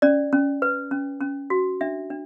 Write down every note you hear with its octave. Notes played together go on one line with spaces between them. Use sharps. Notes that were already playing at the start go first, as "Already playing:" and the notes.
C#4 D5
C#4
B4
C#4
C#4
F#4
D4 E5
D4